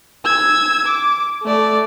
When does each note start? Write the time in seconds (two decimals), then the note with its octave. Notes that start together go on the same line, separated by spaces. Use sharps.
0.25 E6 G#6
0.86 D6
1.43 A3 D5